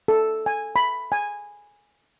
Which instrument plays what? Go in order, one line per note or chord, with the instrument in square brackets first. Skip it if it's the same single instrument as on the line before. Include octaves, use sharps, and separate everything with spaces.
[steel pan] A4
G#5
B5
G#5